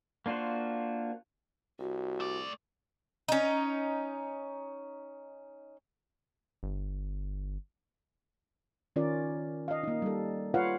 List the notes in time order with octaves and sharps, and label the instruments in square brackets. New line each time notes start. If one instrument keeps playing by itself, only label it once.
[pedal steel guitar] A#3 D4 F4 F#4 C5
[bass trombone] C2 [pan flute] F#4
[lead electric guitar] A3 D5
[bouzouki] C#4 D#4
[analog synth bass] G1
[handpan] D#3 C#4 F4 A#4 D5
D#5 F5
A#3 D#4
G3 A4
F4 B4 C#5 F5 F#5